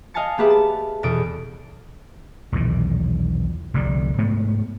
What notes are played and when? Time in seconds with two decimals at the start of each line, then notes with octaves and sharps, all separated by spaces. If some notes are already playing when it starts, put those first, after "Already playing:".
0.14 D#5 F5 G#5 A5 A6 C#7
0.38 A#3 B3 G4 G#4 B4 E5
0.50 A5
1.03 E2 B2 A4 D#6 D7
2.52 B1 E2 A#2 D#3
3.74 F1 C2 D3 G3
4.18 G#2 A3 B3